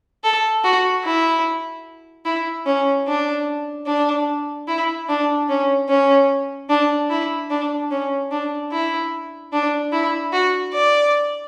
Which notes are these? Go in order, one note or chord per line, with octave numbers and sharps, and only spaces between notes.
A4
F#4
E4
E4
C#4
D4
D4
E4
D4
C#4
C#4
D4
E4
D4
C#4
D4
E4
D4
E4
F#4
D5